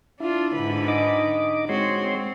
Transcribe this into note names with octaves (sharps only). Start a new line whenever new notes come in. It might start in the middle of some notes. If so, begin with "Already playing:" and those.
D4 E4 F4
G#2 D3 B4
D#4 D#5 D6
G#3 C4 F#4 C#5 C6
C4